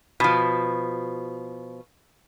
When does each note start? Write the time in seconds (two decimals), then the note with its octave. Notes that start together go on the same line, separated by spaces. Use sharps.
0.20 B2 F3